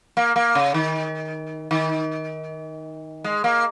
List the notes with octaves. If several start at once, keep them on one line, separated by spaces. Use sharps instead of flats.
A#3
A#3
C#3
D#3
D#3
G#3
A#3